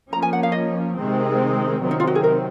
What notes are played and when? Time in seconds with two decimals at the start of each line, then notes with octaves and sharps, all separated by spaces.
0.10 F3 A#3 C#4 A#5
0.22 G#5
0.33 F#5
0.43 F5
0.52 D#5
0.95 C3 D#3 G#3 C4
1.80 C3 D#3 F#3 C4
1.91 D#4
2.00 F4
2.07 F#4
2.15 G#4
2.24 A#4